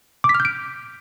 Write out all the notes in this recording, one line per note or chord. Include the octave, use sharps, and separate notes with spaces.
D6
B6
F6
G6
D7